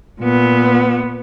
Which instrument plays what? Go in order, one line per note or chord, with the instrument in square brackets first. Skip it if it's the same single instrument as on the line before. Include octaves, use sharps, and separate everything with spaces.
[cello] A#2 B3